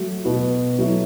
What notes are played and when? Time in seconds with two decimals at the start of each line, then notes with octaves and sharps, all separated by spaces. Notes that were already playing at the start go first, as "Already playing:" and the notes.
Already playing: F#3 A3 F#4
0.25 B2 B3 F#4
0.79 F#3 A3 E4